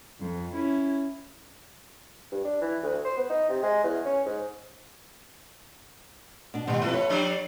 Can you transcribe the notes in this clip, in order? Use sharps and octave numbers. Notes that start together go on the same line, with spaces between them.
F2
C#4 E4
G2
D4
E3
D2
C5
B3
D#4
C3
G#3
E2
C#4
G#2
B2 D4
G#2 B2 D#3 G3
F2 B2 E4 A4 B4
C#5
F3 G3 D4